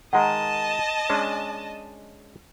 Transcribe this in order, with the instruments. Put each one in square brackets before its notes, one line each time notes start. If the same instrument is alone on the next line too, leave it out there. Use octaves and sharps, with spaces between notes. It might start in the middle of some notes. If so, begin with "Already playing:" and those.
[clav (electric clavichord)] D#3 G#3 A#4 [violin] D#5 A5 [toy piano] F#5 A#5
[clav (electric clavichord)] G#3 C#4 D4